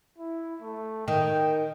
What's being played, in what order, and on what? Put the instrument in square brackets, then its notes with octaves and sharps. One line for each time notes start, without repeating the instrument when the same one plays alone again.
[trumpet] E4
A3
[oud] D#3 [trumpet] G5